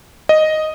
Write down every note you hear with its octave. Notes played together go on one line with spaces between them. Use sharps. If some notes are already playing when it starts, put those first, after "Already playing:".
D#5